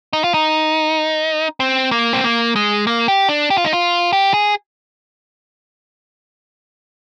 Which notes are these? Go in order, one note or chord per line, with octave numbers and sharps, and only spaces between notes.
D#4
F4
D#4
C4
A#3
C4
A#3
G#3
A#3
G4
D4
G4
F4
D#4
F4
G4
G#4